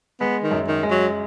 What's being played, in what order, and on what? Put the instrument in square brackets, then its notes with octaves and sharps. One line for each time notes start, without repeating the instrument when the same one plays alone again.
[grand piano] G#3 [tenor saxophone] B3
[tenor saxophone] D#3
[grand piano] F#2
[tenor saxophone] D#3
[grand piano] G#3
[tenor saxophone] F#3